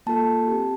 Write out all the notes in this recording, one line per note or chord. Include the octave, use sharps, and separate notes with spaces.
A#3 F4 A4 A5
C4 G4